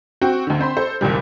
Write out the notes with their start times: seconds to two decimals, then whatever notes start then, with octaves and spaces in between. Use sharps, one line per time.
0.21 C4 F#4 G5
0.47 D2 D3
0.59 C4 C5 B5 C6
0.77 A4 C5
1.01 F#1 D#2 A#2 G3